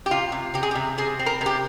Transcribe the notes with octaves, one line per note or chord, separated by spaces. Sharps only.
G4
C3 F4
C3
C3 G4
G#4
G4
C3
C3 G#4
C4
A#4
C3
G4